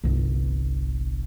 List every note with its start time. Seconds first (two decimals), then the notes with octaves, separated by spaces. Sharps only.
0.04 G1 C2